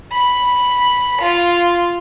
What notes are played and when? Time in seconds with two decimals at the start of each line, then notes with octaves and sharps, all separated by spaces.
0.13 B5
1.21 F4